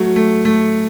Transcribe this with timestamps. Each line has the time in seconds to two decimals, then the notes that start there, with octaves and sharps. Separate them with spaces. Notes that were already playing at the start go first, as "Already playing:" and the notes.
Already playing: F#3 A3
0.16 A3
0.45 A3